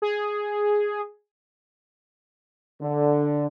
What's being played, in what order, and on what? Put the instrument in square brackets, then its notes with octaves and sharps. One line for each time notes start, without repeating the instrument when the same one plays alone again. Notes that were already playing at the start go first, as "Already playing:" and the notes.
[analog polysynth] G#4
[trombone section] D3